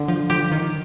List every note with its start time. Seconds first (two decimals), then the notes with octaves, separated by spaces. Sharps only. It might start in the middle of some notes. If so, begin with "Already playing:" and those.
Already playing: D3
0.08 F3
0.30 F3 G4
0.52 D#3